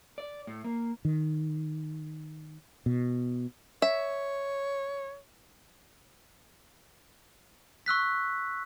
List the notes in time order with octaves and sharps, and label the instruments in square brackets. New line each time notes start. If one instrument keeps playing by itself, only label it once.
[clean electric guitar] D5
A2
A#3
[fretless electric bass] D#3
B2
[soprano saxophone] C#5 [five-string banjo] E5
[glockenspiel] C#6 E6 F#6 B6